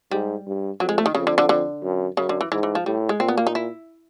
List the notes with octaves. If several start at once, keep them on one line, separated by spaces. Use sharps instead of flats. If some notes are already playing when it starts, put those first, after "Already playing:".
G#2 G3
G2
F2 F#3
G#3
A3
D#3
F2 C#3
D3
D3
D3
F#2
F#2 C#3
D3
E3
G#2 E3
E3
F3
A2 G3
G#3
A#2 C4
B3
A#3
D#4
E4